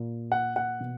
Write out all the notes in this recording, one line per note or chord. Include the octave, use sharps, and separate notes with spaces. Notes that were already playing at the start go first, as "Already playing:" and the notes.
Already playing: A#2
F#5
F#5
B2